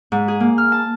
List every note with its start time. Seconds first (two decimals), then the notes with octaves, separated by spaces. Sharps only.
0.12 G#2
0.28 G#4
0.40 A#3
0.58 F6
0.72 A5